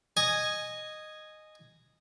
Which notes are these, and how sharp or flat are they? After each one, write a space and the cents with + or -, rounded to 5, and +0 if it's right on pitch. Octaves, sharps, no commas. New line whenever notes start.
D#5 -10 G#5 +0